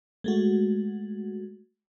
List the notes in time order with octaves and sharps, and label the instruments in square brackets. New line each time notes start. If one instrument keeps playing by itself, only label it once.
[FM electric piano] G#3 A3 F#4